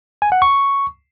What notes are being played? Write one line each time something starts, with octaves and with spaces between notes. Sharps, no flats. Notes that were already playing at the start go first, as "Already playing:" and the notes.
G#5
F#5
C#6